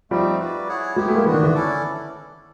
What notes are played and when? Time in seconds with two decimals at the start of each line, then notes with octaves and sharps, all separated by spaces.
0.11 F3 G3 A3 C4 D#4
0.39 F#4 B4 D5
0.68 E4 G#4 C#5 F#5
0.96 F#3 G#3 B3 E4 G4
1.08 A3
1.15 G#3 A#3
1.25 E3 B3 D4 F#4
1.34 D#3
1.43 D3 E3
1.54 C#4 E4 A4 D5